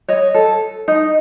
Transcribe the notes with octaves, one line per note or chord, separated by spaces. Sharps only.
C#5 D#5
A4
D#4